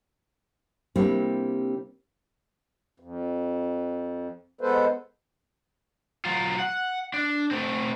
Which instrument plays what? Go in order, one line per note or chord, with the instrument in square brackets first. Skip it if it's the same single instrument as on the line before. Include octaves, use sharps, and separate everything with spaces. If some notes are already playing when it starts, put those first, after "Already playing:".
[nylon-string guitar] C3 G3 A#3 C4 D4 E4
[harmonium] F2
G#3 B3 A4 B4 C5
[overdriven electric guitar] F#3 F4
F#5
D4
A3 C4